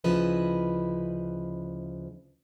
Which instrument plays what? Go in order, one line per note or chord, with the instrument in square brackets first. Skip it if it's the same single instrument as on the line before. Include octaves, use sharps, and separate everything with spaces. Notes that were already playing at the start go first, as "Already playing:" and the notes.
[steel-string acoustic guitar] D2 C#3 F3 E4 B4 D#5